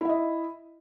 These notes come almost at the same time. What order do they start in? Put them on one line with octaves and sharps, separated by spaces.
E4 E5 D#5